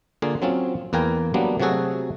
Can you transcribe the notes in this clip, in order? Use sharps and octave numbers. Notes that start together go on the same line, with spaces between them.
D3 A#3 F4 G#4
F#3 C4 C#4 F4
E2 A#3 A#4 B4 G5 G#5
F#3 G3 A#3 B3 D4
C3 F#3 A3 F#4 G#4 A4